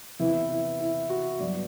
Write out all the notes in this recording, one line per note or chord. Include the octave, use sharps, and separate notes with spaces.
E2 C3 E3 B3 E4
E4
E4
F#4
G2 F#3 B3 D5